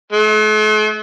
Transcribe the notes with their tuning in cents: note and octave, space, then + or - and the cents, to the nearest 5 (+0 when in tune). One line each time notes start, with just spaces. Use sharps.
A3 -45